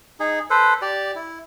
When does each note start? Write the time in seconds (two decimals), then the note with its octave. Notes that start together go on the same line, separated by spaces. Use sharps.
0.20 D#4 G#4
0.50 A4 B4 C5
0.82 G4 D5
1.15 E4